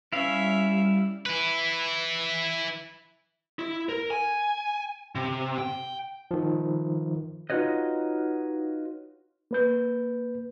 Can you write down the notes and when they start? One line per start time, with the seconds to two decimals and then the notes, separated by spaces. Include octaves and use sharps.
0.13 G3 C#4 E4 E5 F5
1.26 E4 B4
3.59 E4
3.89 A#4
4.10 G#5
5.15 C3
5.58 G5
6.31 D#3 F3
7.50 D#4 F4 F#4 B4 C#5 D#5
9.51 A#3 B4 G6